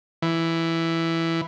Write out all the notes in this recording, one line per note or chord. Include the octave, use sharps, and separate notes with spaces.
E3